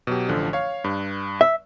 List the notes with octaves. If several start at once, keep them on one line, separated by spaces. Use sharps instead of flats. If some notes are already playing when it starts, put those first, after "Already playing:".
B2 F#3 G4
A1 D3 F3
C#5 F5
G2
E5